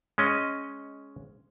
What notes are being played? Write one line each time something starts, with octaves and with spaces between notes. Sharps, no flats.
G#3 C#4 D#5